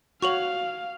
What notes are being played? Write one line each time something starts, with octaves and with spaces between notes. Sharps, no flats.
F#4 C#5 F5 F#5 C#6 F7 F#7